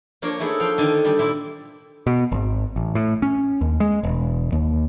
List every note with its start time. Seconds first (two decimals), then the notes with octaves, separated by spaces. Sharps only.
0.22 F3 A#3 D4 A#4 C#5
0.39 A3 D#4 E4 G#4 A4 C#5
0.60 F3 F5 G5
0.78 D3 D#3
1.05 G3 D4 D#4
1.19 A#2 G3 E4
2.07 B2
2.32 G#1
2.76 A1
2.95 A2
3.22 C#4
3.61 D#2
3.80 G#3
4.03 E1
4.52 D#2